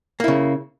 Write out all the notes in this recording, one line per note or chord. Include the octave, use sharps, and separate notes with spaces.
C#3 A#3 E4